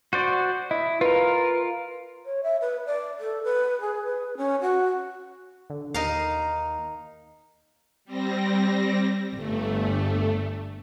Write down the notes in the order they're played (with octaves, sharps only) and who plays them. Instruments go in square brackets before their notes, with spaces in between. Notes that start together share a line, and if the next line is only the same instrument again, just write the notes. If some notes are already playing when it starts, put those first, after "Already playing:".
[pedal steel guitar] F#4 C5 D5
[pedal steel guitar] E4 [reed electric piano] D#5
[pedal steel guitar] F4 A#4 [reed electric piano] B4
[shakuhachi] C#5
E5
B4
D5
A4
B4
G#4
B4
C#4
F#4
[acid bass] D3
[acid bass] D#2 [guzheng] D#4 A#4 F5
[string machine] G3 C4 A#6
[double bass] G1 G2 [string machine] A3